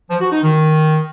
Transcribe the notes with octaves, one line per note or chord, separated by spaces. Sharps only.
F3
F#4
D#4
D#3